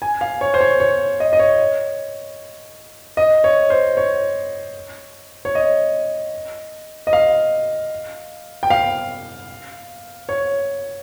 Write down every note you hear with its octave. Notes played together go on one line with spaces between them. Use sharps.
G#5
F5
C#5
C5
C#5
C#5
D#5
D#5
C#5
D#5
C#5
C5
C#5
C#5
D#5
D#5
F5
G5
F5
C#5